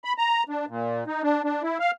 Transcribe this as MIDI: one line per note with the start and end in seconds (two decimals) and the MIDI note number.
0.04 0.13 83
0.18 0.43 82
0.49 0.65 62
0.69 1.04 46
1.07 1.22 63
1.23 1.43 62
1.44 1.62 62
1.63 1.78 64
1.80 1.91 77